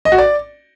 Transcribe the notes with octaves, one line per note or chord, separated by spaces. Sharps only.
D#5
F#4
D5